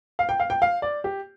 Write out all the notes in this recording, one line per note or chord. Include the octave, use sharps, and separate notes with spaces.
F5
G5
F5
G5
F5
D5
G4